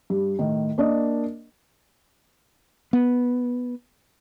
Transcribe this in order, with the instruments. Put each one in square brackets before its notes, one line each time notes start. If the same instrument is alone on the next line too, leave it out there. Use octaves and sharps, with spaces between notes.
[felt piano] G2
A2 D#3
A#3 D4 D5 D#5
[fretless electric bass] B3